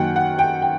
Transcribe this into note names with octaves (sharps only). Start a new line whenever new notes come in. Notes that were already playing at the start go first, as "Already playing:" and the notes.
Already playing: F#2 D#3 F#3 A#3 F#5 G5
F#5
G5
G5